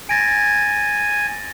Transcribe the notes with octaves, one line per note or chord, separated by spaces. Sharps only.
G#5 A6 A#6 D7